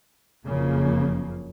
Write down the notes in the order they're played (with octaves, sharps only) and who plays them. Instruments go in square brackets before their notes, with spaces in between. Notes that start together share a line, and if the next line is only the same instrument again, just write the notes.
[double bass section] F#1 F2 C#3 F3 A#3